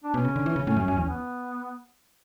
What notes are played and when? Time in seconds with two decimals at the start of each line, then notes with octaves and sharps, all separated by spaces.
0.04 D4
0.14 B2 C#4
0.25 C#3
0.36 D3
0.46 E3
0.56 C#3
0.67 A2
0.76 F#2
0.88 F#2
0.97 E2
1.08 B3